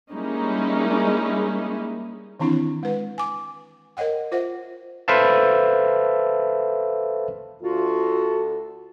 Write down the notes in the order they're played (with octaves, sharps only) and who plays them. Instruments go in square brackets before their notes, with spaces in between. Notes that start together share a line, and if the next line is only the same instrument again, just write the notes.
[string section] G3 G#3 A#3 C#4 D#4 E4
[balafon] D#3 E3 C4 D4 E4
G#3 B4
G#5 D6
A#4 C#5 D#5 F#5 G5
F4 C5 E5 F#5
[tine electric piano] A4 B4 C5 E5 F5 A5
[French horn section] D2 A4 [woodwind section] F4 F#4